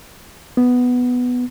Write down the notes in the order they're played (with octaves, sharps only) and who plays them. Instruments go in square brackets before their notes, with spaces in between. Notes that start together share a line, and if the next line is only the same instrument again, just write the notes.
[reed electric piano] B3